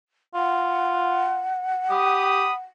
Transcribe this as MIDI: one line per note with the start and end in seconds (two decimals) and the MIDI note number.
0.35 1.46 65
0.35 2.59 78
1.91 2.47 67
1.91 2.54 83
1.91 2.54 87